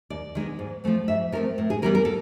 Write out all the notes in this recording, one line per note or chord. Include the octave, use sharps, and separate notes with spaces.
D#2 D5
D#3 G#3 B3
G#2
F3 A3 C4
G#2 E5
F3 A3 C4 A#4
A2
G#4
E3 G3 B3 A#4
A#4
A4